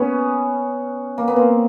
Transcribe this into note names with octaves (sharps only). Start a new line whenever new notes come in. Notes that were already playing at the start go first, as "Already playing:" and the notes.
Already playing: B3 C#4
A#3
B3
A#3 C4